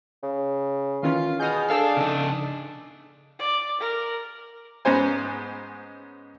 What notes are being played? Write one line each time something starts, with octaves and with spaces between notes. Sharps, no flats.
C#3
D#3 E3 C#4 F4
B2 G#4 D#6 F6 G6
D4 A4 F5 E6
C#3 D#4
D5
A#4
G#2 B3 C#4 C5 G#5